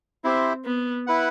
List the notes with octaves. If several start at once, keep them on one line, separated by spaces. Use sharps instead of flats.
C4 E4 G4 C5 E5
B3
E4 B4 F#5